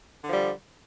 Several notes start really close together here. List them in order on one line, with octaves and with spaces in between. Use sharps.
D3 F3 G3